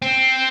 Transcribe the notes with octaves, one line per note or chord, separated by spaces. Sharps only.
C4